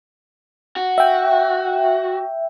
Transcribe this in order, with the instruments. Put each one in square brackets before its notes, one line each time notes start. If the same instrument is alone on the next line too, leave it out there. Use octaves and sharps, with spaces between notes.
[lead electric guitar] F#4
[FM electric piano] E5 G5